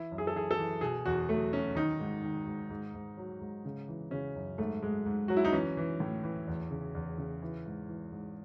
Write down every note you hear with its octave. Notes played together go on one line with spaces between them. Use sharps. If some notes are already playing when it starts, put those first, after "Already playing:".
Already playing: E3 E4
F#2
G#4
A4
E3 G#4
A4
E3
B2 G#4
E2 F#4
F#3 A3
F#3 C#4
D#3 D#4
G#2
D#3
G#2
G#2
G#2
F#3
G#2
C#3
E3
C#3 C#4
F#2
G#2 A3
G#2 G#3
G#2
F#3 F#4
E4
D#4
E3 C#4
E3
A2
E3
E2
C#3
E2
C#3
E3
G#2
E3
G#2